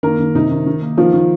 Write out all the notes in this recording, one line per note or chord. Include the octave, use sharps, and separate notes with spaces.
D#3 A#3 A#4
D#3
C3 D#4
D#3
D#3
A#3
D#3 F3 F4
D#3